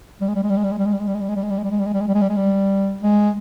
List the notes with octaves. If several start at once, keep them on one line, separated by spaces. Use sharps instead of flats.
G3
G#3
G3
G#3
G3
G#3
G3
G#3
G3
G#3
G3
G#3
G3
G#3
G3
G#3
G3
G#3
G3
G#3
G3
G#3
G3
G#3
G3
G#3
G3
G#3
G3
G#3
G3
G#3